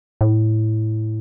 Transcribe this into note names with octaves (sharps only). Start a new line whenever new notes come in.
A2